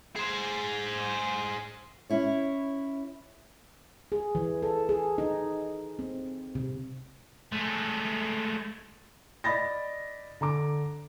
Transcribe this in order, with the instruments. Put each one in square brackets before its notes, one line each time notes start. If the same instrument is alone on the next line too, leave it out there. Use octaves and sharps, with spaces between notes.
[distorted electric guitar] G#4 C5
[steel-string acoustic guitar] C#4 E4 C#5
[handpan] G#4
E3
A4
G#4
D#4
C4
C3
[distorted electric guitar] G#3 A3
[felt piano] D5 D#5 B5 A6 A#6
D3 A#5 D6